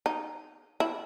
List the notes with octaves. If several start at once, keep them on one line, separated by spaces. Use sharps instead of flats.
D#4
E4